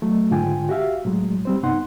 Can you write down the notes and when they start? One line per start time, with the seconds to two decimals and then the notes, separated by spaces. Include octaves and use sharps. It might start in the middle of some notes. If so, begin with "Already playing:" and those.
0.02 F#3 A3
0.31 G#2 D3 F4 G5 G#5
0.69 F#4 G4 E5 F5
1.05 A2 F#3 G#3
1.45 G3 C4 C5
1.63 G2 C3 B3 D#4 F#5 C6